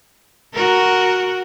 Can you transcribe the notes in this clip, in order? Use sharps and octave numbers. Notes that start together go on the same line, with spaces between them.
F#4 A#4